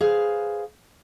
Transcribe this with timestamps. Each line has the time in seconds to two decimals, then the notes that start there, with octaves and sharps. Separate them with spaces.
0.01 G#4 B4 C5 F5